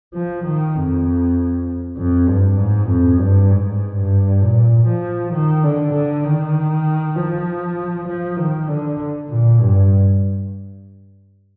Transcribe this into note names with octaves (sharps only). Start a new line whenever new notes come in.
F3
D#3
F2
F2
G2
G#2
F2
G2
G#2
G2
A#2
F3
D#3
D3
D3
D#3
F3
F3
D#3
D3
A#2
G2